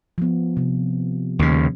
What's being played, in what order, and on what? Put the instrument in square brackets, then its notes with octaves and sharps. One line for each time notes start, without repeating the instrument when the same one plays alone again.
[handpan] F3 B3
C3
[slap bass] D#2 C#3